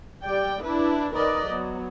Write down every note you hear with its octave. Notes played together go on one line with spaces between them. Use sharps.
G3 D5 G5
D4 E4 B4
D#3 A#4 B4 D5 D#5
F#3 B3